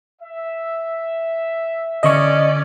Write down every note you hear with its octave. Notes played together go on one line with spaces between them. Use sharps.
E5
D3 C#4 D5 D#5 C#6